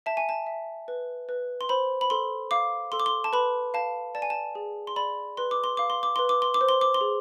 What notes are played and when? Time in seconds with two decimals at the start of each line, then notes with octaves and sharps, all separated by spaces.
0.06 E5 A5
0.17 G#5
0.29 A5
0.47 E5
0.88 B4
1.29 B4
1.61 C6
1.69 C5 B5
2.01 B5
2.10 A4 C6
2.51 F5 D6
2.92 A4 C6
3.00 D6
3.06 C6
3.24 A5
3.33 B4 B5
3.74 F5 A5
4.15 D5 A5
4.22 G#5
4.30 A5
4.55 G#4
4.87 C6
4.96 D5 B5
5.37 B4 C6
5.51 D6
5.64 C6
5.77 F5 D6
5.90 C6
6.03 D6
6.16 B4 C6
6.29 D6
6.42 C6
6.54 D6
6.61 C5
6.69 C6
6.81 D6
6.94 C6
7.01 G#4